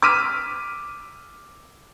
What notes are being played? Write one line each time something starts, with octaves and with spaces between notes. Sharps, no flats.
D6 E6 F6 B6 D#7